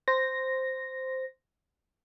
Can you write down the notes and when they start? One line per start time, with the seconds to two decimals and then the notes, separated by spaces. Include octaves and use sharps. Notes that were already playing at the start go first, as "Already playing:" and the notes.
0.08 C5 A#6